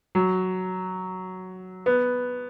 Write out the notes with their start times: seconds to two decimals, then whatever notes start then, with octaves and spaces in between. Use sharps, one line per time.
0.15 F#3
1.86 B3